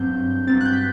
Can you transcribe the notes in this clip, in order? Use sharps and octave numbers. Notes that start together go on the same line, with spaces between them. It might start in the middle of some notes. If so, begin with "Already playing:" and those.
Already playing: G2 F#3 C4 G6
G2 F#3 C4 A6
F#6
G6
B6